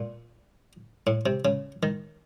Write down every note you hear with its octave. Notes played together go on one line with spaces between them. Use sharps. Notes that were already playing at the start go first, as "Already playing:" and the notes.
Already playing: A#2
A2
C3
C#3
D#3